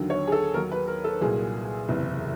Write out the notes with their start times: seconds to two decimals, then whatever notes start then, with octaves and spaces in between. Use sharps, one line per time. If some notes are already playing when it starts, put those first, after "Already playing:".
Already playing: D#2 D3 F#3
0.10 C#5
0.27 G#4
0.32 A4
0.54 D#2 D#3 F#3 A#4
0.72 B4
0.87 A#4
1.04 A4
1.21 C2 A#2 F#3 G#4
1.88 F#1 E2 C3